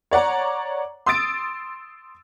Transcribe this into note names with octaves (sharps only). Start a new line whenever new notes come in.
C#5 D5 F#5 A#5
C6 D#6 E6 A6 D7